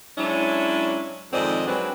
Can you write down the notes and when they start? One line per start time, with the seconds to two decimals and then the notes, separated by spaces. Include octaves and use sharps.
0.18 F#3 G#3 C#4 D4 E4
1.33 F2 G#2 D#3 C4 D5 D#5
1.67 F#3 G#3 C4 D4 F#4 B4